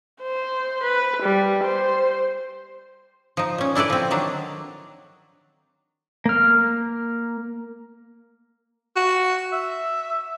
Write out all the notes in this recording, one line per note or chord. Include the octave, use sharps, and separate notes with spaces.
C5
B4
G3
C5
F3 D#4
A#2 C#4
D4 E4 A4 B4 D5
F3 C4
D#3 F#3 D4
A#3 F6
F#4
E5